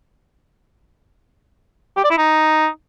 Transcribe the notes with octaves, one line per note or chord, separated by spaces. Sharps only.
G4
D5
E4
D#4